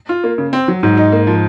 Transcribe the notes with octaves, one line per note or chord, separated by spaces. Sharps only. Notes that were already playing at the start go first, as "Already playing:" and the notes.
F4
A#3
C#3
C4
F#3
G#2 F#3
D#4
A#3
F3